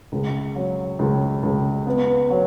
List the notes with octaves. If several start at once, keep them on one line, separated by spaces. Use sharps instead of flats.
C#2
F#3
C#2
C#2
B3
F#3